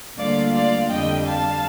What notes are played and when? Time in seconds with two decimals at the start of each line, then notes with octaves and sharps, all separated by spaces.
0.17 D2 D3 G3 A#3 F4 D5 F5
0.53 D5 F5
0.89 F2 D3 G3 D#5 G5
1.25 F5 A5